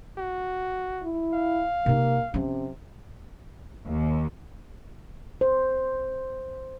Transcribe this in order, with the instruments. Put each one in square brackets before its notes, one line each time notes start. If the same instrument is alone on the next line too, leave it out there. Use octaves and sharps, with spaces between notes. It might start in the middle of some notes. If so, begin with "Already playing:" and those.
[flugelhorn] F#4
[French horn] E4
[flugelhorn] F5
[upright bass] C3 D#4 [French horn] A#3
[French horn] C3 [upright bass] F3 C#4
[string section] D#2
[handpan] C5